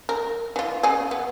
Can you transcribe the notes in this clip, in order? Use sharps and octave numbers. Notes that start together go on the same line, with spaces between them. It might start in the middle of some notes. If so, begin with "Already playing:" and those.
A#4
E3 F4
C#3 G#4
B3